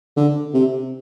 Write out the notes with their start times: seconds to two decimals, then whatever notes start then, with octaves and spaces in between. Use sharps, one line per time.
0.17 D3
0.54 C3